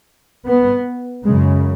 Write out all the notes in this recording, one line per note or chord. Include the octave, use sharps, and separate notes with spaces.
B3
F#2 C#3 G#3